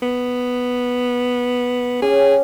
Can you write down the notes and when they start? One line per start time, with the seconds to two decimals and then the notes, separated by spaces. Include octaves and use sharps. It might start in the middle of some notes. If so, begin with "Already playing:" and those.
0.02 B3
2.02 C#4 G4 G#4